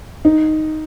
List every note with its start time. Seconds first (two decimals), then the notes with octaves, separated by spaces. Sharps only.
0.25 D#4